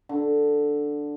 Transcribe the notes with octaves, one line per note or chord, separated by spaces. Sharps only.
D3